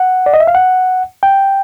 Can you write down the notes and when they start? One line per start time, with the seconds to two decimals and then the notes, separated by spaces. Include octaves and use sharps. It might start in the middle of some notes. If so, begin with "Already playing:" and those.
Already playing: F#5
0.26 D5
0.34 D#5
0.40 E5
0.47 F5
0.55 F#5
1.23 G5